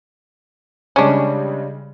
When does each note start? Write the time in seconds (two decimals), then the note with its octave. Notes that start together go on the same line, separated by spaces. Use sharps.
0.96 C#3 G3 G#3 C#4 D4